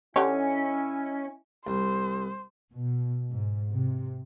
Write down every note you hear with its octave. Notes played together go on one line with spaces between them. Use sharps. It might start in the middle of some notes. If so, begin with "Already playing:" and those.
D3 C#4 E4 G4 C#5 D#5 G#5
C2 C5
B2
G#2
C3